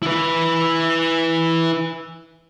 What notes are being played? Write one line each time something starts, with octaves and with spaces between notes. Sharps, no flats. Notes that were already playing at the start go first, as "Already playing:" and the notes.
E4 B4